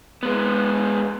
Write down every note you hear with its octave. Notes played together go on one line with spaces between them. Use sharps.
G#3 B3